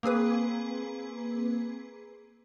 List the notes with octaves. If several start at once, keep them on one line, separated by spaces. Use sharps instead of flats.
A#3 C4 G#4 B4